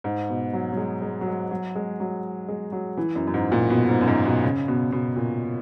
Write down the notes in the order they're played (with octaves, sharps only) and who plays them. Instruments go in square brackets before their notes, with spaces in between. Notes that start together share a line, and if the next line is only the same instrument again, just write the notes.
[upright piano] G#2
B2
F#3
F#3
G#3
G#3
F#3
G#3
F#3
G#3
F#3
G#3
F#3
E3
F#2
F#2
G#2
A#2
B2
G#2
F#2
G#2
B2
C#3
B2
B2
A#2